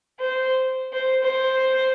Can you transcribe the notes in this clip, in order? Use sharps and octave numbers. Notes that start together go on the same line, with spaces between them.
C5
C5
C5